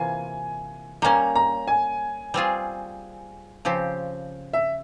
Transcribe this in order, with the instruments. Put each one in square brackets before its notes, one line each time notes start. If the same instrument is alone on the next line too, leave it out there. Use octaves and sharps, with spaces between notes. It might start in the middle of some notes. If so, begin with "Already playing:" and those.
Already playing: [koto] C3 E3 A#3 F4 [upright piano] G#5
[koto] G3 A#3 C#4 [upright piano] A#5
[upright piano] A#5
G#5
[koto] G3 C4 F4 G#4
C#3 F3 C4 G4
[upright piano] E5